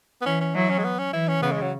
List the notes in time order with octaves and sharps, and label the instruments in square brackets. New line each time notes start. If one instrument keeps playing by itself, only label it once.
[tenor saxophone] B3
[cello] E3 [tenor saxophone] C#4
[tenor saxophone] C#4
[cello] F#3 [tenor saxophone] E4
[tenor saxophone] C#4
G#3
B3
C#4
[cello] E3 [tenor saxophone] E4
[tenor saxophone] C#4
[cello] C#3 [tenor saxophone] B3
[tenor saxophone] G#3
F#3